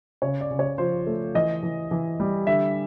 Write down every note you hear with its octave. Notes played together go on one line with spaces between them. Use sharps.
C#3 C#5
D5
C#3
C#5
F3 C5
A3
E3 D#5
E3
E3
G3
D3 E5